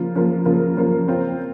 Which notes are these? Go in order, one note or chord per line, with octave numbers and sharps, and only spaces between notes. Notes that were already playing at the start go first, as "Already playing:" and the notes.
Already playing: C#3 F3 A#3 F4
C#3 F3 A#3 F4
C#3 F3 A#3 F4
C#3 F3 A#3 F4
C4 F4 C5